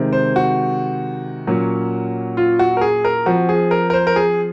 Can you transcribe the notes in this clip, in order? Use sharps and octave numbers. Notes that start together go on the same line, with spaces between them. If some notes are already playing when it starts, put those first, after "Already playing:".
Already playing: C3 D#3 G#3 C4
C5
F#4
A#2 F#3 A#3 C#4
F4
F#4
A#4
G#4
A#4
F3 C4 F#4
G#4
A#4
A#4
C5
A#4
G#4